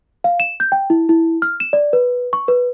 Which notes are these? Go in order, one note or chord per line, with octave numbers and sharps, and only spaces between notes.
F5
E7
G6
G5
E4
E4
F6
E7
D5
B4
C#6
B4